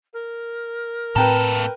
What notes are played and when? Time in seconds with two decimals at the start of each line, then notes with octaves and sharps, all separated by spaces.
0.13 A#4
1.16 A2 A#3 C4 A4 B4 G5 A#5